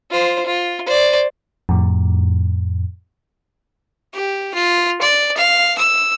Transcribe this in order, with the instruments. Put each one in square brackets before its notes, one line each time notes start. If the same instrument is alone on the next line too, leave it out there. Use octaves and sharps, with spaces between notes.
[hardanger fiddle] F4 C5
F4
C5 D5
[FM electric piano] F2 A2
[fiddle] G4
F4
D5
F5
E6